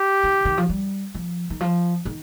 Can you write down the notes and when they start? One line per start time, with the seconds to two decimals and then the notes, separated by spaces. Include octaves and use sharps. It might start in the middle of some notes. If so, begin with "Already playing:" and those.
Already playing: G4
0.24 D#3
0.45 D#3
0.58 F3
0.69 G3
1.15 F3
1.50 D#3
1.61 F3
2.05 D#3